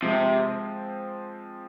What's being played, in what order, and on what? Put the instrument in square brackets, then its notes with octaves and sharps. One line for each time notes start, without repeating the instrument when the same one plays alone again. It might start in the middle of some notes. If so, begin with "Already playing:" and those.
[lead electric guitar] C3 [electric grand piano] F3 G#3 C4